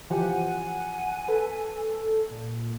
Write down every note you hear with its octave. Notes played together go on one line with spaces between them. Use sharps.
E3 F3 G4 F#5 G#5
A4 B4
A#2